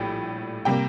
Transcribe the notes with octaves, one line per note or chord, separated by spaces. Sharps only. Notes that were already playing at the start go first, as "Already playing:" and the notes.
Already playing: A#1 A2 G3 G5
C3 G3 A#3 G5